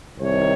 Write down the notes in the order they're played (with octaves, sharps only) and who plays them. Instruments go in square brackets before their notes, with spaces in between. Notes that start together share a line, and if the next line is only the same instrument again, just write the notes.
[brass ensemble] C2 C3 D#3 C#5